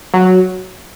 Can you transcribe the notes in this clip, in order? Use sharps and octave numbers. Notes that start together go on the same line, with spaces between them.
F#3